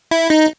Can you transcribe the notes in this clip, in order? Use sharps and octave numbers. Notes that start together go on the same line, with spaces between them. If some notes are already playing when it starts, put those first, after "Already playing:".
E4
D#4